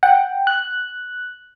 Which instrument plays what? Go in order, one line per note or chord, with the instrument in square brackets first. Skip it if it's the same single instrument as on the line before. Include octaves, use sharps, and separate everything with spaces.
[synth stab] F#5 [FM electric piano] G5
[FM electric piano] F#6